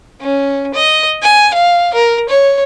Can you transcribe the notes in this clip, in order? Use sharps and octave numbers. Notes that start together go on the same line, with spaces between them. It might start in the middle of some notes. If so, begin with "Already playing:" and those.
C#4
D#5
G#5
F5
A#4
C#5